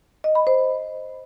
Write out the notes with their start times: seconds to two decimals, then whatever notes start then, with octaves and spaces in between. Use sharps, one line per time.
0.24 D#5
0.35 B5
0.47 C5